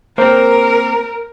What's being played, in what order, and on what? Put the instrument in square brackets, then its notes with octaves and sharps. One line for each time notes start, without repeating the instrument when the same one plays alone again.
[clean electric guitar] A#3 C4 [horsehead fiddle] A#4 [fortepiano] C5 [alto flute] A#5